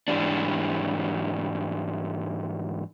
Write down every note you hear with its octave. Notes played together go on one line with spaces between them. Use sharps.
G#2 E3 G3 D4